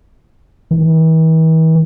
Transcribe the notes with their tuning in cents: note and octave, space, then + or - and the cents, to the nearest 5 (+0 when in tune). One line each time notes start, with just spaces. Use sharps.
E3 -45